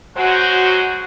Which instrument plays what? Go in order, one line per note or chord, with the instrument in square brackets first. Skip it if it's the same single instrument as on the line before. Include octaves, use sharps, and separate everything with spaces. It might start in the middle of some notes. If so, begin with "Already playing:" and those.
[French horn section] F#3 G#3 C5 [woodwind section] F#4 F#5